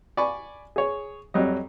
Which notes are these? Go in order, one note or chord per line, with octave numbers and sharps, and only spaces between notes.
D5 G#5 B5 C#6
G#4 C#5
F2 F#3 G3 D#5